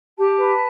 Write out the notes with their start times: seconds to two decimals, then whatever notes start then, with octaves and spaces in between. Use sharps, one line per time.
0.18 G4 A5
0.38 B4